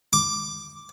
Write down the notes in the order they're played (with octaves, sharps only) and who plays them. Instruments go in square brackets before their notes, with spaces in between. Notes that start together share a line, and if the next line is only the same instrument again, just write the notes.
[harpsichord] D6